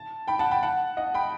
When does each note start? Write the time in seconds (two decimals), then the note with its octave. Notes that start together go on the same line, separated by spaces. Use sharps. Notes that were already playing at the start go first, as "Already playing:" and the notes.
Already playing: A5
0.28 G5 B5
0.39 F#5 A5
0.51 G5 B5
0.63 F#5 A5
0.97 D#5 F#5
1.14 G5 B5